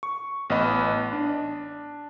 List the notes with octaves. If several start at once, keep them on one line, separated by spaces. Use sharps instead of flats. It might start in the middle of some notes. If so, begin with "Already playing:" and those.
C#6
A1 B3 B4 D#5 B5
D4